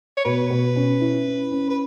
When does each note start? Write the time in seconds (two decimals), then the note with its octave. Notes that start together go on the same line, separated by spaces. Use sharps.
0.17 C#5
0.25 B2 B4
0.50 B2
0.76 C#4
1.01 E4
1.26 C#4
1.51 C#4
1.70 B4